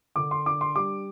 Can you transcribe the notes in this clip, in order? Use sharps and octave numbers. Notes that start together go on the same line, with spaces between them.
D3 D6
C6
D4 D6
C6
G3 D6